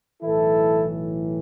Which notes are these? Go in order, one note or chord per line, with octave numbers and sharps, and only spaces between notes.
B1 A2 E3 E4 A4